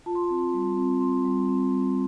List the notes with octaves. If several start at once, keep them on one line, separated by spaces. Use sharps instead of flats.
F4 A5
C6
A5
C4
G3
C4
C4 C6
G3
C4
G3